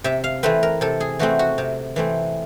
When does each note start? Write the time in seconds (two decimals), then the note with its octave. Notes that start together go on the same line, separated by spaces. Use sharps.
0.04 C3 E5
0.24 F5
0.43 E3 A3 C4 B4
0.63 A#4
0.81 C3 A4
1.00 G#4
1.19 E3 A3 C4 F#4
1.39 F#4
1.58 C3
1.96 E3 A3 C4